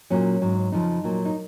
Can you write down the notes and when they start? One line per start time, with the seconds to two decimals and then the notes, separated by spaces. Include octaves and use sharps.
0.10 A#2 F#3 C#4
0.42 G#2 F#3
0.72 F2 C#3 F3 D#4
1.04 A#2 F#3
1.25 D#4